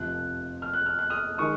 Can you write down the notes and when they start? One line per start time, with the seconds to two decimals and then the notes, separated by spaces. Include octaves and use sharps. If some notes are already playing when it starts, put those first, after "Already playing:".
Already playing: F1 F2 C3 F3 F#6
0.62 F6
0.73 F#6
0.86 F6
0.99 F#6
1.10 D#6 F6
1.38 D#3 G#3 C#6 D#6